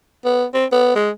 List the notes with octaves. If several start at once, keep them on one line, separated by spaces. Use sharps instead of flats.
B3
C4
B3
G#3